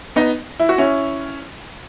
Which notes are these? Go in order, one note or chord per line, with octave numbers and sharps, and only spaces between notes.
B3 D#4
E4
F#4
C#4 E4